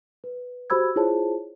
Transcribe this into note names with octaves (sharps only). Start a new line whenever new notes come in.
B4
F#4 G4 C5 B5 E6 G#6
E4 F4 G#4 C5 C#5 A5